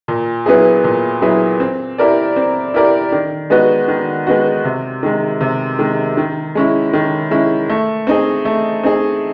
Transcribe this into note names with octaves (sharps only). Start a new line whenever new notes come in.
A#2
F#3 B3 E4 G#4
A#2
F#3 B3 E4 G#4
C4
E4 G4 A#4 D5
C4
E4 G4 A#4 D5
D#3
G#3 B3 D#4 F#4
D#3
G#3 B3 D#4 F#4
C3
D#3 G#3
C3
D#3 G#3
D#3
G#3 C#4 E4
D#3
G#3 C#4 E4
A3
C4 D#4 G#4
A3
C4 D#4 G#4